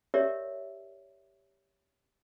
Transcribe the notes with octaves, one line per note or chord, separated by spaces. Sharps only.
G4 A#4 C#5 D5 E5